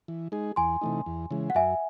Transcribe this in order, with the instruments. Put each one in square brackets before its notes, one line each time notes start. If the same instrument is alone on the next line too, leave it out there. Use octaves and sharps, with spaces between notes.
[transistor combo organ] E3
G#3 D#4 G#4
[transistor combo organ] E2 [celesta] G#5 C6
[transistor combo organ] C3 E3 A3 D#4
E2
C#3 E3 G#3
[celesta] F#5
[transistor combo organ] F#2 [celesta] E5 G#5